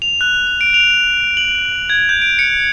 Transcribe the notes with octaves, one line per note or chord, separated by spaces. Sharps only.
F7
F#6
F7
D7
F7
F#7
G#6
G6
D7
C#7